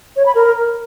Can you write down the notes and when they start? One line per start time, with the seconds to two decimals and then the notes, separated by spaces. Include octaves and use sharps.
0.16 C#5
0.26 B5
0.35 A#4